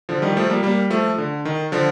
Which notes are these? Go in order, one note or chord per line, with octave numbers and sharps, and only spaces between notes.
D3 F3
D#3 G3
F3 A3
G3 A#3
G3 A#3
F3 A3
D3
D#3
D3 F3